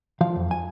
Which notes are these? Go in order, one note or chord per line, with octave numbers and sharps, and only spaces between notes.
F3 F5
F2
G#5